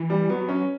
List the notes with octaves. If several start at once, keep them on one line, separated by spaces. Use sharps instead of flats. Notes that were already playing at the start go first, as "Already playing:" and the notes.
Already playing: E3
G3
F#3 B3
C#4